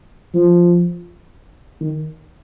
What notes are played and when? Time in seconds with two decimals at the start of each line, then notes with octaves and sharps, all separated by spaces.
0.34 F3
1.81 D#3